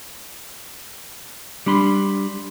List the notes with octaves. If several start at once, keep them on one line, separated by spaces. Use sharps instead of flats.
G3 D4 B5 C6